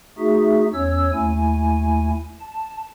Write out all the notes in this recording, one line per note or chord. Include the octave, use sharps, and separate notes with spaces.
A3 D#4 F#4 G#4 E5
E2 C#4 C#5 E6
D#2 A3 E4 G#5
A5